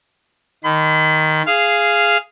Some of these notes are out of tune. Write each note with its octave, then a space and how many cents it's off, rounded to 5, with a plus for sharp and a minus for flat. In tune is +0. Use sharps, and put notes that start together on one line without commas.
D#3 +0 B5 +40
G#4 +0 F5 -10